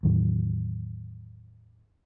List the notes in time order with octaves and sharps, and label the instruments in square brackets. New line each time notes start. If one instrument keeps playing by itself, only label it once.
[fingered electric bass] E2 A2 D#3 F#3